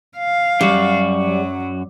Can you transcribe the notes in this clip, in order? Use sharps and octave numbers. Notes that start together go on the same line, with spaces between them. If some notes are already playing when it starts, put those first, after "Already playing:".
F5
F#2 G3 F#4
F#3